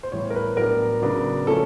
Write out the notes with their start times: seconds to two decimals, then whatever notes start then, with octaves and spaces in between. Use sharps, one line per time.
0.03 C5
0.12 A2 E3 G3 B3 C#5
0.30 A#4
0.36 B4
0.57 A2 F#3 B3 D4 A#4
1.02 C#3 F#3 B3 D4
1.47 F3 A3 C#4 A4